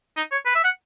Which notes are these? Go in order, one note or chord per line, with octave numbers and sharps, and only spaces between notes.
D#4
C#5
B4
E5
F#5